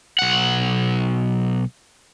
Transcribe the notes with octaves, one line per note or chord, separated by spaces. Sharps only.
B1 F#5